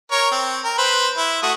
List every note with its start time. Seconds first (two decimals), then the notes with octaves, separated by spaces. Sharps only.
0.11 A#4 C#5
0.32 C4
0.64 A#4
0.78 B4 C5
1.17 E4
1.43 A3 F#4 D#6